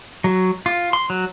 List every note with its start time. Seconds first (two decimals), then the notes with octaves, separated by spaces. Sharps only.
0.24 F#3
0.66 F4
0.93 C6
1.10 F#3